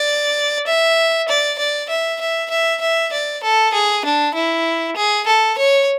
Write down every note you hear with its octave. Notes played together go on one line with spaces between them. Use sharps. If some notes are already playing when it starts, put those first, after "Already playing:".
Already playing: D5
E5
D5
D5
E5
E5
E5
E5
D5
A4
G#4
D4
E4
G#4
A4
C#5